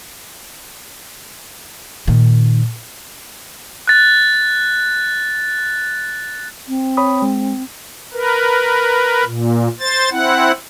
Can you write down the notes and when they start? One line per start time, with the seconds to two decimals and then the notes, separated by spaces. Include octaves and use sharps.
2.07 A#2 D#3
3.87 F#6 A6
6.68 C4
6.97 C#5 B5 D#6
7.22 G#3
8.13 A#4 B4
9.25 A#2
9.80 C5 A6
10.11 C4 E4 F#5